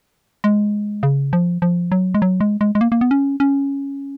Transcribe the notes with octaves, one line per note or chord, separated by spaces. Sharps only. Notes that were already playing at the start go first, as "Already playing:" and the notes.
G#3
C#3
F3
F3
F#3
G#3
F#3
G#3
G#3
G#3
A#3
A#3
B3
C#4
C#4